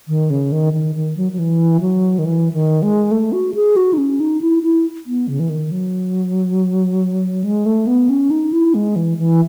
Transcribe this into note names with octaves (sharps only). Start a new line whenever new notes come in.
D#3
C#3
D#3
D#3
D#3
F#3
F#3
E3
F#3
D#3
E3
D#3
G#3
A3
F#4
G#4
F#4
D#4
C#4
D#4
E4
E4
B3
C#3
E3
D#3
F#3
G#3
A3
B3
C#4
D#4
E4
G#3
E3
E3